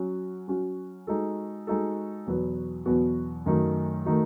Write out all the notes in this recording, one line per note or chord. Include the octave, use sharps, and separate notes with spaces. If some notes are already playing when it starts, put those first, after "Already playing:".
Already playing: F#3 C#4 F#4
F#3 C#4 F#4
G#3 D#4 F#4 A4
G#3 D#4 F#4 A4
E2 B2 F#3 B3 F#4
E2 B2 F#3 B3 F#4
F#2 D#3 A3 D#4 F#4
D#3 A3 D#4 F#4